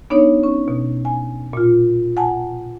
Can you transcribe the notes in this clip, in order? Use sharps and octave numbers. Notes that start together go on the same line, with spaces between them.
B3 D4 D#4 C#5
C#4
B2
G#5
A#2 F4
F#5 G#5 A5